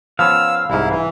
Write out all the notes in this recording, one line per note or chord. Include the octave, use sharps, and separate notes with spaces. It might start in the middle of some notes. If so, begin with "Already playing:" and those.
F3 B3 C#4 F5 E6
C2 G#2 E4
E3